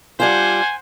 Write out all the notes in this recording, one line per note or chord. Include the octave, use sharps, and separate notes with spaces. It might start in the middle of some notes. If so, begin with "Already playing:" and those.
G3 D4 F4 C5 F#5 G#5